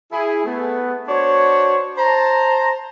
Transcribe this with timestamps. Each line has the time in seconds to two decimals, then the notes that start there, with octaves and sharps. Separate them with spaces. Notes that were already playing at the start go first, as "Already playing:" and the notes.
0.12 E4 G#4
0.45 A3 B3
1.08 D4 F#4 C5 C#5
1.98 C5 A5 A#5